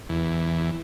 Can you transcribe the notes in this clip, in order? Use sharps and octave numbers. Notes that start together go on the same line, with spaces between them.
E2